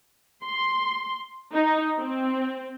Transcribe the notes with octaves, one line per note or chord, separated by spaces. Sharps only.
C6
D#4
C4